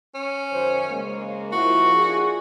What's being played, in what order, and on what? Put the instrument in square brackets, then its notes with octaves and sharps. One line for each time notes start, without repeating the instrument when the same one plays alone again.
[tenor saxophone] C#4
[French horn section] F#2 D#3 C5
C#3 G#3 A#3
[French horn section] F3 A#3 E4 [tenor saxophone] F#4
[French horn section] D4 F4 G#4